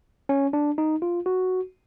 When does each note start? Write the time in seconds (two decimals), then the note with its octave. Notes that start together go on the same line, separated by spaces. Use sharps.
0.29 C#4
0.53 D4
0.78 D#4
1.02 F4
1.26 F#4